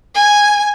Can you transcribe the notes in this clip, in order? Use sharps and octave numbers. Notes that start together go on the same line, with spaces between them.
G#5